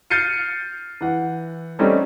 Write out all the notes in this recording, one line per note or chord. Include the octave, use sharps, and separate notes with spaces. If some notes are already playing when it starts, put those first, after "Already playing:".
F6 G6 A6 C7 C#7 D#7
E3 F#5
G3 A3 C4 C#4 D#4